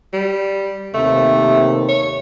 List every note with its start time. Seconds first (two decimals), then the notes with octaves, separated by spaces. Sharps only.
0.13 G3
0.94 D#2 C3 A3
1.89 C#5